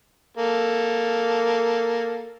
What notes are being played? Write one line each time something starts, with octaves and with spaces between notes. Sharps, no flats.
A#3 A4